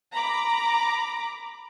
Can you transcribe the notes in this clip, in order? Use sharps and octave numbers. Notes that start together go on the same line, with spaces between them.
A#5 B5 D6